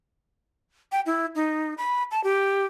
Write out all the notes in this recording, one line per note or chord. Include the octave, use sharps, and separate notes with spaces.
G5
E4
D#4
B5
A5
G4